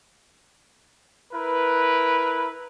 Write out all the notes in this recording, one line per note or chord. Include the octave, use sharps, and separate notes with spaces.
E4 A#4 B4